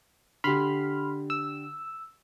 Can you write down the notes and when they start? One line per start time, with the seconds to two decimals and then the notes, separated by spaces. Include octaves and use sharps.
0.44 D3 G4 B5 C6 F6
1.30 E6